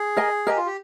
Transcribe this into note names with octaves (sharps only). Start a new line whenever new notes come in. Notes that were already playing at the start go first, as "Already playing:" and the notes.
Already playing: G#4
A#4 D#5 G#5
G4 A#4 D#5 G#5
F4
G4